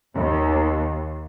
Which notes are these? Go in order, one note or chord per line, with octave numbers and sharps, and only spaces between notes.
D#2